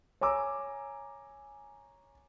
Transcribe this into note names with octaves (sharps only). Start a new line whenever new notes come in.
C#5 G#5 A#5 D6 E6